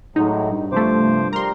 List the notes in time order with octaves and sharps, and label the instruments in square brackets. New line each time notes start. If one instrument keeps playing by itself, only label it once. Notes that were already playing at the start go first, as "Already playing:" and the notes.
[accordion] A2 F#3 G#3 [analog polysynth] D#4
[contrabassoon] G2
[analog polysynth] C3 A3 [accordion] F3 C5 D6
[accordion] F3 G3 A#4 [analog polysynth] A#5 C6